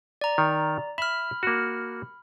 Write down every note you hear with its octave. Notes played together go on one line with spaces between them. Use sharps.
D5 A#5
D#3
E5 B5 F6
A#3 F#4